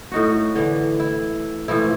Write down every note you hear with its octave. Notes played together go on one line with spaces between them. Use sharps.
A2 D#4 F#4
D3 E3
E4
A2 E3 F3 E4